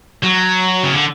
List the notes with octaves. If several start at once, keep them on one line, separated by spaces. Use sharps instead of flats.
F#3
C#3
D3